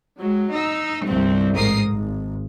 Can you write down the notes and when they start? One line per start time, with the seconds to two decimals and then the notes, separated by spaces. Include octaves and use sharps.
0.19 F#3 G#3
0.53 D#4 E6
1.06 G1 C2 G2 C4
1.56 A1 G#2 A#4 D#6 C7
1.89 G#1